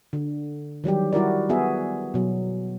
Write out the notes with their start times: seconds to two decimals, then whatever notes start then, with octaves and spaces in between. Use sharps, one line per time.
0.13 D3
0.84 D#3 F#3 G3 G4
1.13 G3 E4 F#4 A#4 D5
1.49 B3 F#4 G#4 E5
2.14 B2 F#3